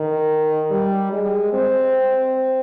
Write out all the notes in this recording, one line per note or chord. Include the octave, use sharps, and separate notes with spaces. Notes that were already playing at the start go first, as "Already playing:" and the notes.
Already playing: D#3
G3
G#3
C4